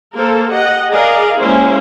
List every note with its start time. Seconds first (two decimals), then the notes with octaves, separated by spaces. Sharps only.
0.14 A#3 A4 A#4 C5
0.51 G4 D#5 F#5
0.90 G#4 A#4 D5 D#5 F5
1.36 G#3 A#3 C#4 E4 G4 C5